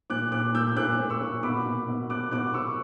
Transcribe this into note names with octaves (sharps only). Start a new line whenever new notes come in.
A#2 D6 F#6
A#2 D6 F#6
A#2 E6 G6
A#2 D6 F#6
A#2
C#6 E6
A#2
B2 B5 D6
B2
B2
B2 D6 F#6
B2 D6 F#6
B2 C#6 E6